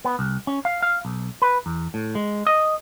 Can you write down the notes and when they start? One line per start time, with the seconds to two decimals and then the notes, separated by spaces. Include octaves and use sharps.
0.05 B3
0.19 C2
0.47 C#4
0.65 F5
0.82 F5
1.05 B1
1.42 B4
1.66 E2
1.94 A2
2.15 G#3
2.47 D#5